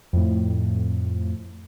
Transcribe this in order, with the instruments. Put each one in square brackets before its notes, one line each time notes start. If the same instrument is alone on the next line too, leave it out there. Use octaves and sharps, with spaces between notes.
[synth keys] F2 A2